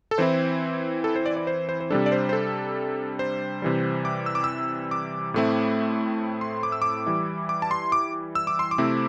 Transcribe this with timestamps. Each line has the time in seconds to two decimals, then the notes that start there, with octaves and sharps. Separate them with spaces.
0.11 A4
0.18 E3 C4 E4 C5
1.04 A4
1.16 C5
1.26 D5
1.37 D5
1.47 C5
1.69 C5
1.80 C5
1.90 C3 G3 D4 A4
2.06 D5
2.12 C5
2.29 C5
2.33 A4
3.19 C5
3.62 C3 E3 G3
4.05 D6
4.26 E6
4.35 D6
4.44 E6
4.91 D6
5.34 A2 A3 C4 E4
6.41 C6
6.63 D6
6.72 E6
6.82 D6
7.06 E3 G3 E4
7.49 D6
7.62 A5
7.71 C6
7.92 D6
8.35 E6
8.47 D6
8.59 C6
8.71 D6
8.78 C3 A3 C4 E4